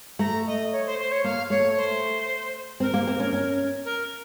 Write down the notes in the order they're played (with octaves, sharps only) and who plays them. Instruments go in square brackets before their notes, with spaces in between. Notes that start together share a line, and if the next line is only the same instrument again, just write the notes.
[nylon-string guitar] A3 [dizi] A#5
[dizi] D#5
C#5
C5
C5
C#5
[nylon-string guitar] A#3 [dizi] F5
[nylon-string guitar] A3 [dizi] C#5
[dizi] C5
[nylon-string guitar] C4 [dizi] A#4
[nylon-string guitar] A#3
C4
C#4
C#4
[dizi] A#4